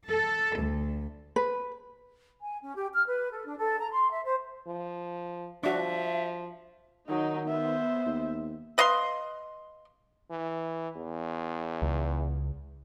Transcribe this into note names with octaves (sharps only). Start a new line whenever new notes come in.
A4
D2
B4
G#5
C#4
G4
F6
B4
A4
D4
A4
A#5
C6
E5
C5
F3
F3 D4 F#4 E5
D#3 F#3 D#4
B3 C5 E5
D#2
B4 D#5 F5 C6
E3
E2
C#2